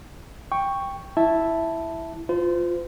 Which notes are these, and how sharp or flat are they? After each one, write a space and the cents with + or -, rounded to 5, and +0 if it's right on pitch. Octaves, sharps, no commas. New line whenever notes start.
G5 +10 C#6 +0
E4 +0 E5 +0 A5 +0
F4 +5 C5 -35